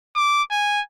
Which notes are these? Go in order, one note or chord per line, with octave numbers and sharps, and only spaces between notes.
D6
G#5